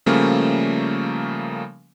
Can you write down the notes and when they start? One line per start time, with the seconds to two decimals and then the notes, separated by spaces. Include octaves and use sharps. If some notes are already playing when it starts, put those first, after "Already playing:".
0.06 C#3 F3 G3 A3 A#3 C#4